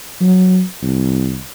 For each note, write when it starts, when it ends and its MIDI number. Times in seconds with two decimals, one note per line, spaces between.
0.21 0.62 54
0.82 1.40 36